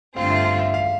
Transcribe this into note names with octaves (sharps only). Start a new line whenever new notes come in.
G2 D3 A3 C4 F4 F5
E5
F5
E5
F5